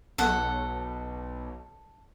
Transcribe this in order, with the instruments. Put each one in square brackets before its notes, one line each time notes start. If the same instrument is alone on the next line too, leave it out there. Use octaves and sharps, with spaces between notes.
[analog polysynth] B1 [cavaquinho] A4 F#5